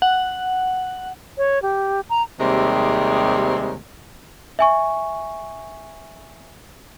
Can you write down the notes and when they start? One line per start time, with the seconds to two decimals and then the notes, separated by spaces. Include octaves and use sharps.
0.02 F#5
1.38 C#5
1.62 G4
2.10 A#5
2.40 D#2 C3 G3 G#3 C4
4.59 E5 G#5 C#6